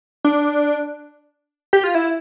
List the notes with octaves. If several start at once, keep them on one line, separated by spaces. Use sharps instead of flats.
D4
G4
F4
E4